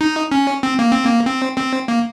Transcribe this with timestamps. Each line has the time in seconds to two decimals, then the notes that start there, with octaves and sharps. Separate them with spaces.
0.01 D#4
0.32 C#4
0.63 C4
0.79 A#3
0.92 C4
1.05 A#3
1.26 C4
1.57 C4
1.88 A#3